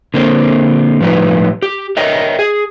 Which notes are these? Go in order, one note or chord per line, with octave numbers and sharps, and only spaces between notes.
D3 A#3 C4
A2 F3 G3 D#4 B4
G4
A#4 C#5 D#5 E5 G5
G#4